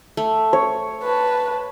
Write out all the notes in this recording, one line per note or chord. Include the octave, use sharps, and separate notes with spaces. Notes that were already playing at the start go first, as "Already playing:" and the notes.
A3
C#5
B4 A5